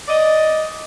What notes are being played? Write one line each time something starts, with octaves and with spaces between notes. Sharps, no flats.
D5 D#5